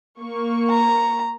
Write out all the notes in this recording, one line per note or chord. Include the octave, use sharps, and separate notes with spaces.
A#3 C#6
A#5